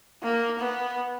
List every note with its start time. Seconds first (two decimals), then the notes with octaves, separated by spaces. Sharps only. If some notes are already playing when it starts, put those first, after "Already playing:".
0.23 A#3
0.59 B3